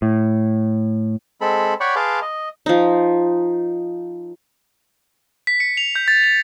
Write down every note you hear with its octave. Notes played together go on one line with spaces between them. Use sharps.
A2
G#3 C4 A4 B5
C#5 D5 F#5 G5 B5 C#6
G#4 B4 F5 A5 C6 D6
D#5
F3 D#4
B6
C#7
F7
G6
A6
F7